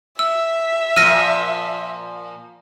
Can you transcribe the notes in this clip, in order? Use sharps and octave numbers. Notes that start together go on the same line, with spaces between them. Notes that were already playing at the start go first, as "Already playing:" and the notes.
E5 E6
A#2 F3 E6 F6 A#6 D#7